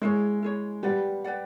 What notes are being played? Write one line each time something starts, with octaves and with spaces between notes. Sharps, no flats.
G#3 E4 G#4 C#5
E4 G#4 C#5
G3 G4 B4 D5 F#5
G4 B4 D5 F#5